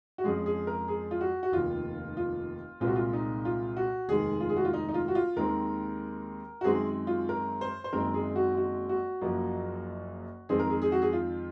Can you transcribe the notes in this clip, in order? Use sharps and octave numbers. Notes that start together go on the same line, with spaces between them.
F#4
F2 C#3 F3 G#3 G#4
G#4
A#4
G#4
F4
F#4
F#4
F1 D#2 D#3 F4
F4
C2 A#2 G#3 C4 F4
F#4
F4
D#4
F4
F#4
F1 D#2 D#3 G#3 G#4
F4
G#4
F#4
F4
D#4
D#4
F4
F#4
F4
D#2 D#3 G#3 C4 A#4
F#4
F#2 D#3 G#3 C4 G#4
F4
A#4
C5
C5
F#1 F#2 D#3 G#3 C4 A#4
G#4
F#4
F#4
F#4
F#1 F#2 F3 A#3
F2 D#3 G#3 C4 G#4
A#4
G#4
G#4
F#4
G#4
F4